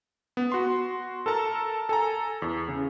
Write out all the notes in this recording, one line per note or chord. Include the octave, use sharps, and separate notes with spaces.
B3
F#4 C6
A4 A#4 A5 A#5
A4 G#5 A#5
E2
C#3